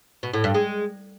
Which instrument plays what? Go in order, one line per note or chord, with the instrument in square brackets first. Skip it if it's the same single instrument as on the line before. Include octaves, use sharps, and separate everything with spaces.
[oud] B2
A2
G2
G#3